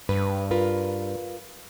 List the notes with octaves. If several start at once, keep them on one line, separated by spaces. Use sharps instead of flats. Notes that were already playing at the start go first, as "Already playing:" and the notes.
G2 B4
F4 A#4 B4